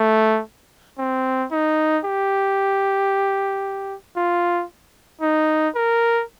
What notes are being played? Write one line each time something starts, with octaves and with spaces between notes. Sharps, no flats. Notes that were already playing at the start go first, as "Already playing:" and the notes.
Already playing: A3
C4
D#4
G4
F4
D#4
A#4